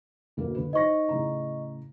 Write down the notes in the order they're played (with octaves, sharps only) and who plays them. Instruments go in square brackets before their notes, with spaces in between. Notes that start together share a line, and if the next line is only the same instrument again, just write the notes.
[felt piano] D2 B2 A#3
D3 B4
[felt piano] D#4 C5 A#6 [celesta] D#5 C#6
[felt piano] A2 C#3 A#5